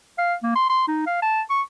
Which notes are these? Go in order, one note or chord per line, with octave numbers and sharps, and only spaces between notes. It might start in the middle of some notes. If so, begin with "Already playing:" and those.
F5
A#3
C6
C6
D#4
F5
A5
C#6